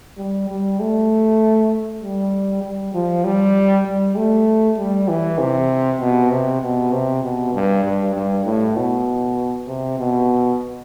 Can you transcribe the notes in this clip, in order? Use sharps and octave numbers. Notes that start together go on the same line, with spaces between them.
G3
G3
A3
G3
G3
F3
G3
G3
A3
G3
E3
C3
B2
C3
B2
C3
B2
G2
G2
G2
A2
B2
C3
B2